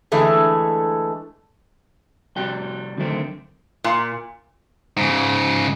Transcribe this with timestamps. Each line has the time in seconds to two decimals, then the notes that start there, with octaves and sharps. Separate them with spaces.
0.12 D3 E3 G#3 A3
2.36 C3 G3 F#4 G5
2.98 D3 D#3 F#3 A3 C4
3.84 A#2
4.97 G#2 C#3